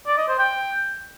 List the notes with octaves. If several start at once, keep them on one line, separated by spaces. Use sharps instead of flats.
D5
D#5
C5
G5